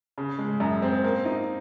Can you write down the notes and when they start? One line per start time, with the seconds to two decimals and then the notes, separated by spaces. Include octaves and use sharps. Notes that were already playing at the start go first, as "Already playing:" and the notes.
0.18 C#3
0.39 G#3
0.60 F#2
0.82 C4
1.04 A#3
1.25 D#4